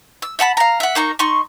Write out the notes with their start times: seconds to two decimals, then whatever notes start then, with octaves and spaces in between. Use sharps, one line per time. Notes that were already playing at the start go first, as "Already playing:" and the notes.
0.22 E6
0.39 E5 F#5 A5 B5
0.57 F5 A#5
0.80 E5 F#5
0.95 A#3 D#4 A#5 C#6
1.19 D#4 C6 C#6